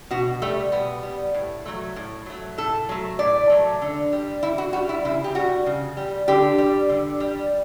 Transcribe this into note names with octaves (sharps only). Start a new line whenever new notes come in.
B2 F#4
G3 A3
B2 B3
G3
A2
F#3 A3
A2
F#3 A3
A2 A4
F#3 A3
A2 D5
F#3 A3
D3
G3
D3 E4
F#4
G3 F#4
E4
C#3 E4
G4
G3 F#4
C#3
G3
D3 G4
G3
D3
G3